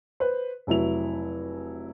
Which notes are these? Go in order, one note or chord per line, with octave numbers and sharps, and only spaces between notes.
B4 C5
F1 F#3 E4 F7